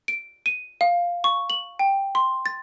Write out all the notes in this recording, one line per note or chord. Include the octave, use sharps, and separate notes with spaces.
D7
D#7
F5
C#6
F#7
G5
C6
A6